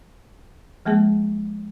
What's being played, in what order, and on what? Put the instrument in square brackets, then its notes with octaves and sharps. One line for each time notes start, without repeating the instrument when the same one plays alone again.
[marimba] F3 G#3 A#3 G#4